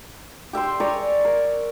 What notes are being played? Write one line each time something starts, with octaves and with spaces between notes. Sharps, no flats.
G4 E5 G5 C6
C#5 D5 G#5 A#5
A#4